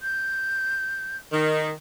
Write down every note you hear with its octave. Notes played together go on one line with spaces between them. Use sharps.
G6
D#3